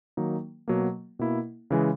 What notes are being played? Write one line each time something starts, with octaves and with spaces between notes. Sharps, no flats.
D#3 F#3 A#3 D#4
B2 F#3 A#3
B2 A#3 E4
C#3 E3 G#3